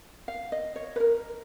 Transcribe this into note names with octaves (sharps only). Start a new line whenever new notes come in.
F5
D#5
C#5
B4
A#4